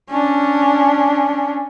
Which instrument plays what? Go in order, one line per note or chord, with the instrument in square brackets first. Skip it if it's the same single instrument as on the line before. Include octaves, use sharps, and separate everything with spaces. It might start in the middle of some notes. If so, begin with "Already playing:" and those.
[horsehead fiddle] C#4 D4